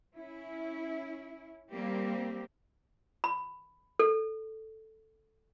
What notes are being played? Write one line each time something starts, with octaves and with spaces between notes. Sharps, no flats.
C#4 E4
G3 A#3 C4 G4
B5
A4